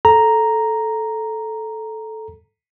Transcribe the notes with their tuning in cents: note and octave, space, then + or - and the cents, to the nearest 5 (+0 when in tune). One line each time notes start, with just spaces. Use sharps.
A4 -10 A#5 +0